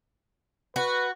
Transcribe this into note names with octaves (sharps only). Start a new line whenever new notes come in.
F#4 B4